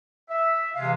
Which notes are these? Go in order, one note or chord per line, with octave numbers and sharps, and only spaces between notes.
E5
C3 E3 G#3 F5